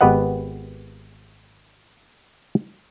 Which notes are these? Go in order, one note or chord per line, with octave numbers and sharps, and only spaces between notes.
G#1 B3 G4 B4 D#5 F#5